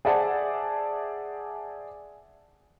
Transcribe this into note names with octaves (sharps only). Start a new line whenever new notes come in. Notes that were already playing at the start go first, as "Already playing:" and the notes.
G#4 C5 D5 E5 F#5 A5